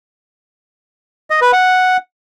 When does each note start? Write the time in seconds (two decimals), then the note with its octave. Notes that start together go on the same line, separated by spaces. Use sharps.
1.30 D#5
1.41 B4
1.53 F#5